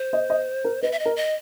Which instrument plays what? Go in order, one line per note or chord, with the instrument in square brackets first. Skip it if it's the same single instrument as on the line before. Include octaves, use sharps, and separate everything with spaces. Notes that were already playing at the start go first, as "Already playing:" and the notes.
Already playing: [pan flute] C5
[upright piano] D#5
D#5
A#4
[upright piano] B4 [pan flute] D#5
[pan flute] E5
D#5
[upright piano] A#4
[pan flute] D#5